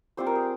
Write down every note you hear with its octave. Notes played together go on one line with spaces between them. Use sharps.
G3 C4 F4 C5
A#4
G#4